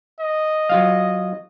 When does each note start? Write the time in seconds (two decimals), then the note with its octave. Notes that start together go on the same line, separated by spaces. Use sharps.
0.20 D#5
0.69 F#3 F4 F5